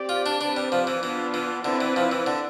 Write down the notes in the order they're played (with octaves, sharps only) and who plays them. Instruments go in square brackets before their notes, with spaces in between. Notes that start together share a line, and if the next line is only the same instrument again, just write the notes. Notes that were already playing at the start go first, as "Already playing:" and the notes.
Already playing: [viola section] C4 G4 D5
[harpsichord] F4
D4
[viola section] C4 G4 B4 D5 [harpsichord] D4
[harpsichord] G3
F3
E3
[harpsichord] E3 [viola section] B3 D4 F4 B4
[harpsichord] E3
[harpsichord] D3 [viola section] C4 E4 B4 D5
[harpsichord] E3
F3
E3
D3